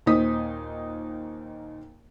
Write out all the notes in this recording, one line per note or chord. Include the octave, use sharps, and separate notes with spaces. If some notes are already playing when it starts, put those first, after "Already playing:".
D#2 A#2 D#4 C5 D#6 B6